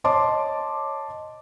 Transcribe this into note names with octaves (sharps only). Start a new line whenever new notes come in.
C#5 D#5 A5 C6 D6